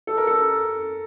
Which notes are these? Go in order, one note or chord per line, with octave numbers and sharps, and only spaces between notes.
A4
A#4
A4